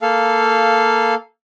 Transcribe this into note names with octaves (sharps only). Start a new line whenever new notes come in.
A#3 A4 F5